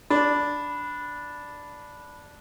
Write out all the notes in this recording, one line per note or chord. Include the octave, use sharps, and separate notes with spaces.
D4 B5